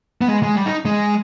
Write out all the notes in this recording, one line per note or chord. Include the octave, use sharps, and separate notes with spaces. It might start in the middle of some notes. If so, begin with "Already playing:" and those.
B3
G#3
G#3
G3
D#4
G#3